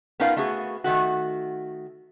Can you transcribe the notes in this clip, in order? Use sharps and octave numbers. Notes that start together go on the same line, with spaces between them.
B3 C#4 D#4 F4 A#4 F5
A3 B3 F#4 G#4
D#3 A3 F#4